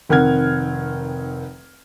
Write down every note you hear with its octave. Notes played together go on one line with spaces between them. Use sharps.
F1 D#3 C4 F#5 F6 G#6